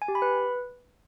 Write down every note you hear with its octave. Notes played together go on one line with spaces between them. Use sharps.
G#5
G4
B5
B4